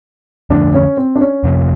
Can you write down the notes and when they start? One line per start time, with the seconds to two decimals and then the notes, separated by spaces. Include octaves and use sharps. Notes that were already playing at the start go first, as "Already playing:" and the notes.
0.50 F2 D3 F3 A3 D4
0.74 C#4
0.97 C4
1.16 D4
1.21 C#4
1.44 F2 C3 F3 A#3